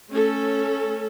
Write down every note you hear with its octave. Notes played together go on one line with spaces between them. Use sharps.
A3 C#4 A4